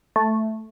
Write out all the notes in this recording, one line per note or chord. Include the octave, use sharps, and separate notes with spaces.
A3